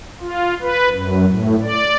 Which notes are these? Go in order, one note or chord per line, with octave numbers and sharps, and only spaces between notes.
F4
B4
F#2
A2
D5